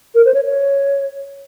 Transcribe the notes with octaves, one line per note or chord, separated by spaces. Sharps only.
A#4
C5
C#5
C#5